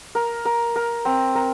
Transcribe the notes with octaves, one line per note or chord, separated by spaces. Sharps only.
A#4
A#4
A#4
C4
A#4